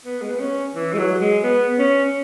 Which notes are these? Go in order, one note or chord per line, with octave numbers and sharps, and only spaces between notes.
B3
G#3
B3
C#4
E3
G#3
F#3
G#3
B3
C#4